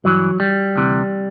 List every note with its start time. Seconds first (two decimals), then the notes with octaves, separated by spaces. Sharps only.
0.04 G2 E3 F#3
0.40 G3
0.76 D2 C3 E3